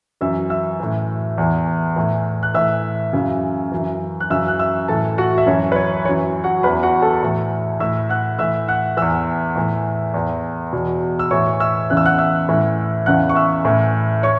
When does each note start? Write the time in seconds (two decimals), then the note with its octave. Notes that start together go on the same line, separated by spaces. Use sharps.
0.21 F#2 E3 E5 E6
0.50 E5 E6
0.80 A2 E3
1.38 E2 E3
1.96 A2 E3
2.43 F#6
2.54 A2 E3 E5 E6
3.13 F#2 C#3 E3
3.72 F#2 E3
4.20 F#6
4.30 F#2 C#3 E3 E5 E6
4.48 F#6
4.60 E5 E6
4.88 A2 E3 A4 A5
5.18 F#4 F#5
5.38 E5
5.46 F#2 E3 C#5
5.72 B4
5.76 C#5
6.05 E3 C#5
6.09 F#2
6.44 F#4 F#5
6.63 E2 E3 B4 B5
6.83 F#4 F#5
7.02 A4 A5
7.23 A2 E3
7.80 A2 E3 E5 E6
8.09 F#5 F#6
8.39 A2 E3 E5 E6
8.68 F#5 F#6
8.97 E2 E3 E5 E6
9.55 A2 E3
10.14 E2 E3
10.73 E2 B2
11.19 E6
11.31 A2 E3 C#5 C#6
11.53 C#6
11.60 E5 E6
11.90 E2 C#3 E3 F#6
11.97 E6
12.05 F#5 F#6
12.18 E5 E6
12.49 A2 E3
13.06 E2 C#3 E3 F#5 F#6
13.29 C#6
13.35 E5 E6
13.65 A2 E3
14.23 C#5 C#6